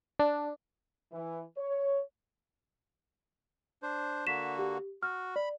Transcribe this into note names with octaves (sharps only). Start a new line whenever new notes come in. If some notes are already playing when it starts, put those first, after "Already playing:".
D4
E3
C#5
D4 C5
D3 A#3 F#4 B6 E7
G4
F#4 F6
D5 B5